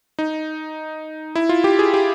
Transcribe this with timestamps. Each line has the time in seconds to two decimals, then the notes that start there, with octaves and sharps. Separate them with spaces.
0.19 D#4
1.35 E4
1.49 F4
1.64 G4
1.79 G#4
1.94 G4